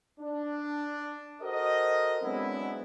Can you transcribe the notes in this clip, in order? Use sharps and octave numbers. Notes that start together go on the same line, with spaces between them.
D4
F#4 A4 A#4 C5 D#5
F#3 G#3 B3 C4 D4 E4